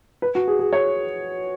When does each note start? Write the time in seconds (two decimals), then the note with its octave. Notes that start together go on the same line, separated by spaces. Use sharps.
0.22 B4
0.35 F#4
0.48 G#4
0.59 G#4
0.73 C#5